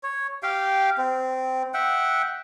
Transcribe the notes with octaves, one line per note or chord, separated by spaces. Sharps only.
C#5
G4 F5 G5
C4
E5 F#5 G5